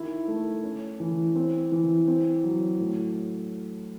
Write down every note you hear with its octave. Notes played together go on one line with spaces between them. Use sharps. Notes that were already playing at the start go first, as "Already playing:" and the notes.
Already playing: D#3 E4
A3
C#4
E3
C4
E3
C4
F#3
A2